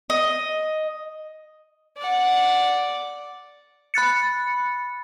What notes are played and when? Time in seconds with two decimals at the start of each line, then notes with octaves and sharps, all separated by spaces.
0.10 D#5
1.98 D5 F#5
3.94 B5 F#6 A6 C#7